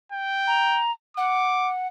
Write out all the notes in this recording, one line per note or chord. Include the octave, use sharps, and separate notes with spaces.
G5
A#5
F#5 D6